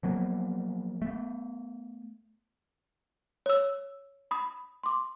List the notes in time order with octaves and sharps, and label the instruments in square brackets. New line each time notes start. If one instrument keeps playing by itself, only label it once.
[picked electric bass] F3 F#3 A#3 B3
A3 B3
[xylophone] C#5 E6
B5 D#6
C6 D6